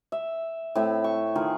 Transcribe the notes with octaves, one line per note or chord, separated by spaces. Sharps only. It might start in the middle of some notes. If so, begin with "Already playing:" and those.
E5
A2 C4 E5
C#6
D#3 F4 G#4